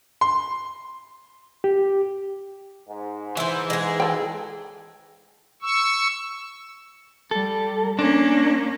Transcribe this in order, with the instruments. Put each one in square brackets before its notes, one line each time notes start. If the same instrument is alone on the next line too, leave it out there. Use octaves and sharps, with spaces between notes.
[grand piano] C6
[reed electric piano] G4
[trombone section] G#2
[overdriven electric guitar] E3 [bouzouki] E4 C5
[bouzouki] G#3 G#4
[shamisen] A4 G5
[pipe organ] C#6 E6
[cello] G3 [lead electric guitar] A4
[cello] A#3 C#4 [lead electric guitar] D4